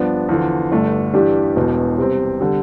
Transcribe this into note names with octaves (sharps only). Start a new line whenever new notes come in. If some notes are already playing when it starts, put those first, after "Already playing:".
Already playing: G2 F3 B3 D4
E2 D3 F3
G1 G2 D3 A3 D4
G2 E3 G3 D4 G4
E1 E2 B2
C3 G3 C4 G4
D3 G3